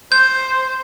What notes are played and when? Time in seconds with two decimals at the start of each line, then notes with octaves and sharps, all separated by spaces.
0.12 C5 G6